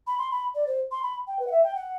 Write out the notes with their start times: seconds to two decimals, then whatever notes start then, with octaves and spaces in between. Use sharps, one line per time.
0.07 B5
0.18 C6
0.31 B5
0.55 D5
0.67 C5
0.92 C6
1.03 B5
1.27 G5
1.39 B4
1.47 F#5
1.51 E5
1.64 G5
1.75 F#5